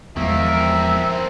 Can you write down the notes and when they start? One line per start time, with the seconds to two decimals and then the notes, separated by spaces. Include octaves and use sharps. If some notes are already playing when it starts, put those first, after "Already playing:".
0.17 E2 D#3 F3 G#3 A#3 E5
0.49 C4 A#4